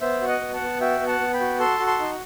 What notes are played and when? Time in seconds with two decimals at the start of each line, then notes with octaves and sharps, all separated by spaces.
0.01 B3 C5 E5
0.21 F#4
0.27 D#5 F#5
0.41 B3
0.54 F#5 A5
0.61 B3
0.81 F#4 E5 G5
1.00 B3
1.07 F#5 A5
1.20 B3
1.34 G5 B5
1.40 F#4
1.60 A4 A5 C6
1.79 F#4
1.87 A5 C6
1.99 D#4